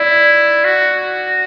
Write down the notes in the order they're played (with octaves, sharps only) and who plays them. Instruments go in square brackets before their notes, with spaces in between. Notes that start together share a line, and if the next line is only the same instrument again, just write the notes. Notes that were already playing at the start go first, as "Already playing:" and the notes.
Already playing: [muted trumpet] E4 [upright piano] D5
[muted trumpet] F#4